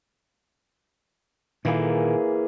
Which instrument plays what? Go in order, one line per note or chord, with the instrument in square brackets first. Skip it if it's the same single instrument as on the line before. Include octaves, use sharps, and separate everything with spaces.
[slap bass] A#2 D#3 [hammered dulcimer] E3 A#3 G#4